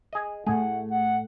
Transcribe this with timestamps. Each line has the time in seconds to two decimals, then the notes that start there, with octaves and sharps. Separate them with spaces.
0.13 G#4 D#5
0.47 A2 A3 G#4 F#5
0.90 F#5